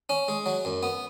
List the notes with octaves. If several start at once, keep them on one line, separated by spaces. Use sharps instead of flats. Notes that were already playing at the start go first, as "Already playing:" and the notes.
C#4
G#3
F#3
F#2
B3